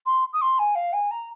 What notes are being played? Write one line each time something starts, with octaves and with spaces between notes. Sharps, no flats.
C6
D#6
C6
G#5
F5
G#5
A#5